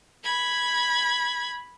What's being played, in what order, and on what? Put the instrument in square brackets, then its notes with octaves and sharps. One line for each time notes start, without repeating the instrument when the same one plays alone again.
[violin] B5 G#6